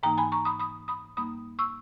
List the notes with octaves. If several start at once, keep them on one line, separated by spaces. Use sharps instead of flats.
G#2 E3 A#3 D#4 G5 A#5
G#5 B5
A#5 C#6
B5 D#6
B5 D#6
B5 D#6
G#2 G3 A#3 D#4 B5 D#6
C#6 E6